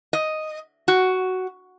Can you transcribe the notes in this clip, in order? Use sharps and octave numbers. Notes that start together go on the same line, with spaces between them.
D#5
F#4